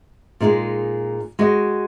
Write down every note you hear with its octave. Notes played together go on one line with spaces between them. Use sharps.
A#2 G#3 D#4 G#4
G#3 F#4 D#5